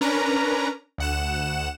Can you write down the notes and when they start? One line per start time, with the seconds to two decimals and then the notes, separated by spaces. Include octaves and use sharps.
0.01 C#4 D4 A#4 B4 A#5
0.98 D2 F#5 E7